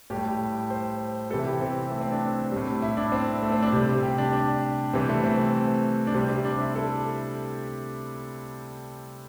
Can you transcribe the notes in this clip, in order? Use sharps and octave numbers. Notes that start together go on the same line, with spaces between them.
A2 G3 G4
C5
C3 E3 G3 A4
E4
G4
C4
A3
C4
D4
A2 G3
E4
D4
C4
A3
C4
D4
C3 G3
G4
D4
D4
C3 E3 G3 C4
A3
C4
D4
C3 G3 C4
D4
E4
A4